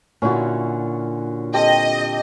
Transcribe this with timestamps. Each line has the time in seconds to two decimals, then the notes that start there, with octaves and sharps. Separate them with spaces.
0.22 A#2 D3 C#4 E4 F#4
1.54 C4 G4 A4 D#5